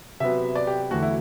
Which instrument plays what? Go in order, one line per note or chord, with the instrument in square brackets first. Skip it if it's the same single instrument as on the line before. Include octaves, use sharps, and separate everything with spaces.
[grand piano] C3 F#3 B3 E5
D5
G4
E2 D3 F#3 A3 F#4
E4